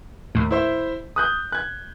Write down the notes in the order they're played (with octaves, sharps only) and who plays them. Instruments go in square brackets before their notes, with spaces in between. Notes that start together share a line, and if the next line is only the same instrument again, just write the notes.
[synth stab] D#2 A2
[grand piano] E4 C5 E5
D#6 F#6 G6
F#6 G#6